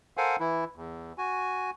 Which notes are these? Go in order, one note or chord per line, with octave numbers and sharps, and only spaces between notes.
A4 A#4 C5 F5 F#5 G#5
E3 E4
E2
F#4 G#5